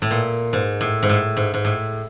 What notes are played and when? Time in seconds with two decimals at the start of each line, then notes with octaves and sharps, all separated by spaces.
0.02 A2
0.11 A#2
0.53 G#2
0.81 A2
1.03 G#2
1.09 A2
1.37 G#2
1.54 G#2
1.65 A2